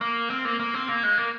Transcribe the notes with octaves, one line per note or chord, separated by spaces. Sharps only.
A#3
C4
A#3
A#3
C4
A#3
G#3
A#3